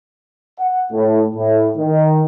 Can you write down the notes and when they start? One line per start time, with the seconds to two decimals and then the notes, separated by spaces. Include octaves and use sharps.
0.59 F#5
0.93 A2
1.35 A2
1.77 D#3